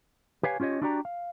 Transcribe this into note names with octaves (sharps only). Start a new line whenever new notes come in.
G4 B4 C#5 F5 G#5
C#4 F4 G4 C#5 D#5
D4 E4 F#4 G4 D5 A#5
F5